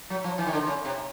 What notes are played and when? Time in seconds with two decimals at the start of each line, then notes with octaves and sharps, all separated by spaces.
0.10 F#3
0.24 F3
0.38 E3
0.46 D#3
0.53 D3
0.67 C#3
0.85 C3